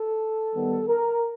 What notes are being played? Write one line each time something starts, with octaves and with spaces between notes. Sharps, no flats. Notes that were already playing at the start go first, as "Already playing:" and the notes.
Already playing: A4
D#3 G3 B3
A#4